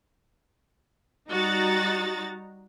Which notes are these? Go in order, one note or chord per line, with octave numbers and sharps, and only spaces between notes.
G3 D#4 F#4 A#5 A6